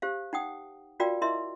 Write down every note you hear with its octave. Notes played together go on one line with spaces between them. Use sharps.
G4 C5 F5
D#4 F#5 G5 D#6
F4 F#4 A#4 D5 F5 G5
E4 A#4 D#5 E5 C6